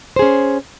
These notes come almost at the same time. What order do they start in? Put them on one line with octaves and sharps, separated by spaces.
C5 G#4 C#4